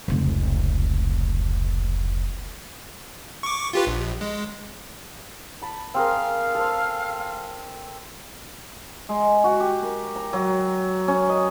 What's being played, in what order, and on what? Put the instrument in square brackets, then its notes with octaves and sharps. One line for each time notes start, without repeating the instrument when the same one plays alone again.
[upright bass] F1 C#2
[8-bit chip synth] C#6 D6
F4 G4 B4
A#1
G#3
[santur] A5 B5
[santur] C4 G#4 A#4 [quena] F5
[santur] A4 C5
[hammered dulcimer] G#3
F#4
G4
A#4
A#5
F#3
C#4
D#5